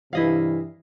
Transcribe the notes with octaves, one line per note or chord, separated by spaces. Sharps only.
G2 C3 E3 E4 D#5 F5